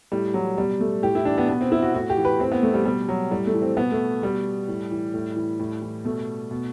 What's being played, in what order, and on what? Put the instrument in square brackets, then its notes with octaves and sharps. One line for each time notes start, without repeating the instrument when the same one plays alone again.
[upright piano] A2 G3
E3 F#3
B2 G3
A3
A2 G4
E4
E3 D4
B3
B2 B3
C4
E4
F#4
A2 F#4
G4
E3
B4
A2 C4
B3
E3 A3
G3
B2 G3
F#3
A2 G3
A3
E3
C4
B2 B3
A3
B2 G3
A2
E3
A2
E3
A2
E3
B2 A3
B2